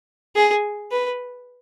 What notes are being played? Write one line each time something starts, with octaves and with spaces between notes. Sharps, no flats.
G#4
B4